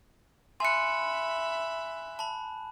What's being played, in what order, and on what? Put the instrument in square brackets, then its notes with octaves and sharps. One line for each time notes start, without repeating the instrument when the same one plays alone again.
[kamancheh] E5 B5 [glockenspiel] G#5 F#6 [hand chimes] C6 C#7
[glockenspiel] A5 B5